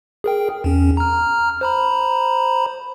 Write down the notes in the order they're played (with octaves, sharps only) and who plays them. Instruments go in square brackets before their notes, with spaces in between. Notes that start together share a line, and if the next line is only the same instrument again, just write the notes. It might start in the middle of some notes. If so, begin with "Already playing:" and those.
[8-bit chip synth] G#4 A#4 G5
E2 C#4
A#5 F6
C5 A#5 B5